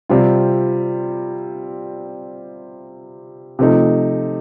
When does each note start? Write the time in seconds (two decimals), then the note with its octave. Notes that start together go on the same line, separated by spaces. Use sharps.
0.09 C3 G3 C4 F4
3.59 C3 F3 A3 D#4